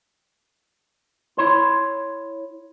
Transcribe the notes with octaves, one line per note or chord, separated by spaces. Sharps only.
E4 C#5 C6